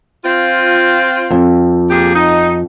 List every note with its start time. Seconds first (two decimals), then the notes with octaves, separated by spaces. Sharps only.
0.24 C4 F4
1.30 F2
1.90 A#2 G4 G#4
2.14 D#4